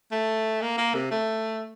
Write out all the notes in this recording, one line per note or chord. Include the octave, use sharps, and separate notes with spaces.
A3
A#3
A#3
C3
A3